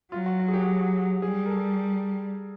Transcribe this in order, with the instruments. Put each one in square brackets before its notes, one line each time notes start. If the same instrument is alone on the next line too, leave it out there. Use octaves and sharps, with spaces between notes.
[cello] F#3 [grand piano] F4
[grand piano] F#4
F#4
G#4
G4
[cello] G3 [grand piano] G#4
[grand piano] A#4
A4